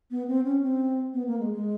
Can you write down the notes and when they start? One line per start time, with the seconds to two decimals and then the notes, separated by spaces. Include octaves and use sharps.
0.11 B3
0.28 C4
0.45 C#4
0.62 C4
1.14 B3
1.27 A#3
1.40 G#3
1.53 G#3